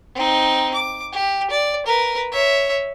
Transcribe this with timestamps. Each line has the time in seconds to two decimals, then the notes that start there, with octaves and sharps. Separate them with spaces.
0.15 C4 D#4
0.74 D6
1.12 G4
1.51 D5
1.86 A#4 B4
2.31 C#5 E5